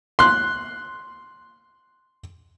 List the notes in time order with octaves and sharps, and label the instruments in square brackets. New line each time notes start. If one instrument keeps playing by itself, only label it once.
[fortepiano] C6 F#6